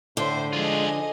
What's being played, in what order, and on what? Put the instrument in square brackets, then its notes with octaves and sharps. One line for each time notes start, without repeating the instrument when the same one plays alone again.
[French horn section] A2 [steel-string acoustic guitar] D3 [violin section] C5 E5
[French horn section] F3 G#3 [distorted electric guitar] F4 G#4 [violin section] D#5 G#5